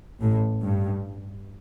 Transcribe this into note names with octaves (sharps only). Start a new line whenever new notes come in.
A1 A2
G2